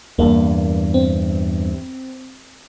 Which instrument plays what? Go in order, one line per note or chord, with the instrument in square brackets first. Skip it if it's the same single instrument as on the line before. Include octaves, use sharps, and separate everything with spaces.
[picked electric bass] E2 G2 [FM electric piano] A#3
[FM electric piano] C4